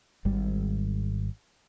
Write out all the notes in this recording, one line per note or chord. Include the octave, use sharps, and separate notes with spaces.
G#1 G#2 G3